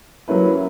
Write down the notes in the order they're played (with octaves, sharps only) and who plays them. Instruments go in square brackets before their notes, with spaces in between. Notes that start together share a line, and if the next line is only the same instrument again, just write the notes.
[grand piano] F#3 A#3 C#4 E4 B4